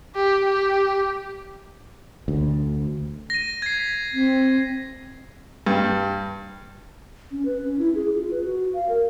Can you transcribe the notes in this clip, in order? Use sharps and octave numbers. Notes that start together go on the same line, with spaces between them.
G4
G4
D2
A#6 D#7
G#6 C7
B6
C4
G2
C#4
B4
C#4
E4
G#4
F4
B4
F#4
F5
A#4